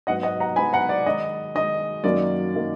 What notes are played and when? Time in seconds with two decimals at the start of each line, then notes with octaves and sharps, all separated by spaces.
0.07 G#2 F#3 B3 D#5 F#5
0.23 D#5 F#5
0.40 F#5 A#5
0.56 G#2 F#3 B3 G#5 B5
0.73 F#5 A#5
0.89 D5
1.06 D#3 G#3 D#4 D#5
1.55 D#3 G#3 D#4 D#5
2.04 F#2 D#3 F#3 A#3 D#4 D5
2.55 D#3 F#3 A#3 D#4